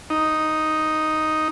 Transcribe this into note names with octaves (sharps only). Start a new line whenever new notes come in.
D#4